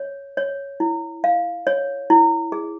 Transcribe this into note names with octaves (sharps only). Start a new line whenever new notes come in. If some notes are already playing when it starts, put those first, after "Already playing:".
Already playing: C#5
C#5
E4
F5
C#5
E4
G#4